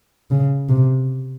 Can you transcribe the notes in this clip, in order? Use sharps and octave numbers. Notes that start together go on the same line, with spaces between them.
C#3
C3